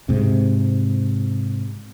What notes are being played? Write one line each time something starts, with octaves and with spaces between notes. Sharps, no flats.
G#2 C3